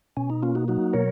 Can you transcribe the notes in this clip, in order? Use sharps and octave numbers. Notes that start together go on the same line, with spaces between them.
B2 C#4
D#4
A#3 C#4 F4
D#4 F#4
F#3 D#4 F#4
B2 A#4 C#5